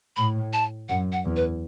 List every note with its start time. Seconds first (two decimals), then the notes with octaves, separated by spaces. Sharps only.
0.16 A2 B5
0.53 A5
0.89 F#2 F#5
1.13 F#5
1.25 E2
1.36 B4